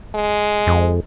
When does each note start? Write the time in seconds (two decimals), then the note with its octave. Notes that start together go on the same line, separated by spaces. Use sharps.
0.15 G#3
0.67 F2